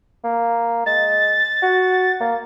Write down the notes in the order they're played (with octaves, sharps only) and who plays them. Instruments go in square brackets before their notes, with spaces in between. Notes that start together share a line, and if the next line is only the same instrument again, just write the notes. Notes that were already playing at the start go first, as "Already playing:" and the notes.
[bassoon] A#3
[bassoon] G#3 [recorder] A6
[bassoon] F#4
A#3